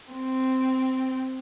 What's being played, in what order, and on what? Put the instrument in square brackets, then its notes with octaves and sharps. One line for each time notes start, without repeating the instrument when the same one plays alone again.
[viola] C4